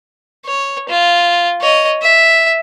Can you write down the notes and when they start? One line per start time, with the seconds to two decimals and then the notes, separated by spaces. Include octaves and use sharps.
0.46 C#5
0.89 F4
1.61 C#5 D#5
2.02 E5